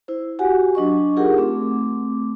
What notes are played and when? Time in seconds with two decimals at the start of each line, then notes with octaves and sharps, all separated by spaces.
0.08 E4 C5
0.39 F#4 G4 F#5 G#5
0.75 F#3 D4 D#5 C#6
1.16 D#4 F4 G4 G#4 A#4 F#5
1.37 A3 C4 D6